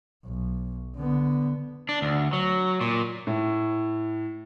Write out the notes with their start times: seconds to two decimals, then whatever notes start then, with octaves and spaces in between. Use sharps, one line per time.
0.25 B1
0.96 D3 B3
1.89 D4
2.02 D2
2.33 F#3
2.81 A#2
3.27 A2